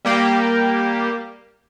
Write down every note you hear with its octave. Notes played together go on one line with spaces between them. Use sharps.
G3 A#3 G4